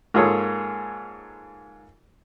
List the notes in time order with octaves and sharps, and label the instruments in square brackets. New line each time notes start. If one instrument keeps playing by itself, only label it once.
[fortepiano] G#2 A#3 F4 G#4 A4 C#5